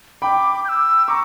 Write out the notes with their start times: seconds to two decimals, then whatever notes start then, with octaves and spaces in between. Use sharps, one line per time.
0.22 G5 B5 D6
0.65 G6
0.69 E6
1.07 A#5 C#6 D6